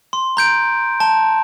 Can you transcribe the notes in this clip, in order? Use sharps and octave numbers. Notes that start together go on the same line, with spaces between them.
C6
A#5 G6 D7
A5